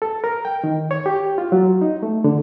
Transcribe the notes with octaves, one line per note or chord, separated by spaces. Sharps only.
A4
A#4
G5
D#3
C#5
G4
F4
F#3
D#4
A3
D3